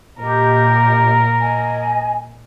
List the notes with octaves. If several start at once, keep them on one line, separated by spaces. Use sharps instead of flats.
A#2 G4 A#4 D#5
D#5 G#5